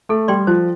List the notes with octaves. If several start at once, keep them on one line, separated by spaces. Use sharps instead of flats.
A3 A4
G3 D5 G5 C6
F3 C5